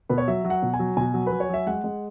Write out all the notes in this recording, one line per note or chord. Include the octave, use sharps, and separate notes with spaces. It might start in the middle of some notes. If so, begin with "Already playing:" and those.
B2 B4
C#5
F#3 E5
F#3
F#5
B2
G#5
F#3
B2 G#5
F#3
B4
F#3
C#5
F#3 E5
G#3 F#5
G#3